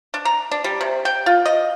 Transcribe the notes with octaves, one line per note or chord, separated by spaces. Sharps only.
D4
A#5
D4
G3
C3
G5
F4
D#5